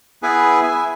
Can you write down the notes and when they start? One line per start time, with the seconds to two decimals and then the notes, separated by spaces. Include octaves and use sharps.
0.23 B3 E4 G#4 B4 G#5
0.63 E5 G#5